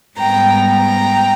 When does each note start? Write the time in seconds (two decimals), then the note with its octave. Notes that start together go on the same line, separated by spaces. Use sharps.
0.18 G#2 G3 B3 G5 A#5
0.70 G5 A#5